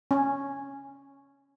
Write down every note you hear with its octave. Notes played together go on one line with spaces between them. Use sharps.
C#4